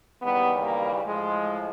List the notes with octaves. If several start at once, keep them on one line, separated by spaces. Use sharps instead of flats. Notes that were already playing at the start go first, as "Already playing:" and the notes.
D#2 C#3 E3 G3 B3
A#3
A2 F3 G#3